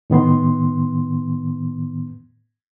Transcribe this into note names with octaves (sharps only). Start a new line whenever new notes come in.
A2 D#3 B3 C6